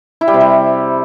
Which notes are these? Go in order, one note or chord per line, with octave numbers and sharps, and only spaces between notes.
E4
G3
C3
G3